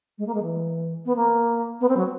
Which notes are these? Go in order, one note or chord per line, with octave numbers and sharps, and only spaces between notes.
G#3
A#3
G#3
E3
B3
A#3
B3
C4
F#3